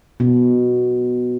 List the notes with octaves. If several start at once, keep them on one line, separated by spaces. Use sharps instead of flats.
B2